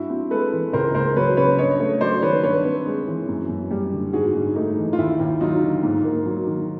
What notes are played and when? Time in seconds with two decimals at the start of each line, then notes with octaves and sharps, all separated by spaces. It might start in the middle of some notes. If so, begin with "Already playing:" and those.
Already playing: G2 E4 F#4
0.10 C4
0.31 G#3 A4 B4
0.52 E3
0.73 C#2 A#4 C5
0.94 C#2 A#4 C5
1.16 F#3 B4 C#5
1.37 C#3 B4 C#5
1.58 G2 C#5 D#5
1.79 A3 C#5 D#5
2.01 F#3 C5 D5
2.22 D#3 B4 C#5
2.43 G2 B4 C#5
2.65 C4
2.86 G#3
3.07 E3
3.28 F#2
3.49 F#2
3.71 G3
3.92 D3
4.13 G#2 F#4 G#4
4.35 G#2
4.56 A3 D#4
4.77 E3
4.93 F4
4.98 D#2 E4
5.19 D#2
5.41 F#3 D#4 F4
5.62 D3
5.83 G#2
6.04 A#3
6.26 F#3
6.47 D#3